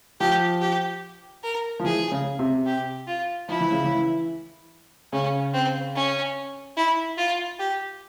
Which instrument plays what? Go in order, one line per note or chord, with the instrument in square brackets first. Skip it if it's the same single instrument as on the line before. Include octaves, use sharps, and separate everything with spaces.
[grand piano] F3 [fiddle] G4
[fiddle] G4
A#4
[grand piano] F3
[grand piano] E3 [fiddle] G#4
[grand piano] C#3
C3
[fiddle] G4
F4
[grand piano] F3 [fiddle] E4
[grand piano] E3
C#3
E3
[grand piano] C#3 [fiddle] C#4
[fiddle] C4
C#4
E4
F4
G4